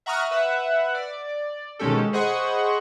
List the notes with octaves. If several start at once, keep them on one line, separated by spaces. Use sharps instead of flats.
E5 F#5 A#5 C#6 D#6 F6
B4 E5 F#5
D5
B2 D#3 G#3 C#4 G4 A4
G#4 C5 D#5 F#5 B5 C#6